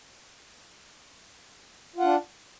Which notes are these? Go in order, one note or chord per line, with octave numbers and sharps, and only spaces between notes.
D4 F4 F#5